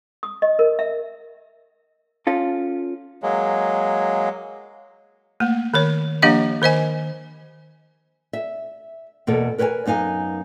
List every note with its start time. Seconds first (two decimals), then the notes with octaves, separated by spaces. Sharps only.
0.23 D#6
0.42 D#5
0.59 A#4
0.79 E5
2.27 C#4 F4 A4
3.23 F#3 G#3 A#3
5.40 A3 A#3
5.74 D#3 A#4 C#5
6.22 F3 A#3 D4 G4 D#5 F5
6.62 D#3 C5 D#5 G#5
8.33 E5
9.27 E2 B2 A#3 A4
9.58 A#4 B4 C#5 G5 G#5
9.86 F#2 B3 D#4 F5 G#5